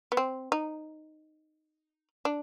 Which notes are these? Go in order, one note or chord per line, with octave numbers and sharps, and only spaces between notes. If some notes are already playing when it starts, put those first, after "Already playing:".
B3
C4
D#4
D4